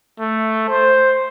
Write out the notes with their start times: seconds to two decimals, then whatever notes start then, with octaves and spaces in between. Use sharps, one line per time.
0.20 A3
0.69 C5